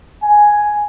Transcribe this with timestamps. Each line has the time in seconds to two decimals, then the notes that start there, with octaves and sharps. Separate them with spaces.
0.23 G#5